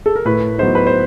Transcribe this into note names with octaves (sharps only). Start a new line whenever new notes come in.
A4
A#4
A2 B4
F#3 B3 D#4 C5
B4
C5